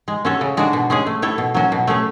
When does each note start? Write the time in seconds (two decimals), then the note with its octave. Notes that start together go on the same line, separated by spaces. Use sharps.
0.08 G#3
0.25 C#4 F#4 A4 C#5
0.41 C#3
0.57 G#3 D4 F#4
0.73 B2
0.90 G#3 C#4 G#4
1.07 A3
1.22 E4 A4 C#5
1.38 B2
1.54 F#3 C#4 F#4
1.72 B2
1.87 A3 C#4 G#4 C#5